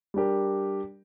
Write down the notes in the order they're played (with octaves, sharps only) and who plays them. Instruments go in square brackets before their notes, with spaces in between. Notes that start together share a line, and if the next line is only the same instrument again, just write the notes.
[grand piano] G3 D4 G4 A#4